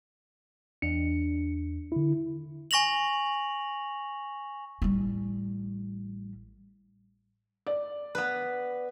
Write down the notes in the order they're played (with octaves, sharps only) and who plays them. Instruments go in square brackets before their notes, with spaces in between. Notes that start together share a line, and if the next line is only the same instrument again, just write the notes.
[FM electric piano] E2 D4 [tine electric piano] C#7
[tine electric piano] D3 E4
[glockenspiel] G#5 C#6 A#6 F7 F#7
[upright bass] A1 G3
[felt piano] D5
[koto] B3 B4